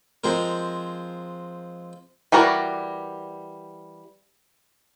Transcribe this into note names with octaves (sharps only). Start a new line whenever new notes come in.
F3 G#3 C4 A#4
E3 G3 F#4 A#4 D5